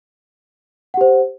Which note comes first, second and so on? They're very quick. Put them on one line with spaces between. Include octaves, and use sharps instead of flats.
F#5 G4 C5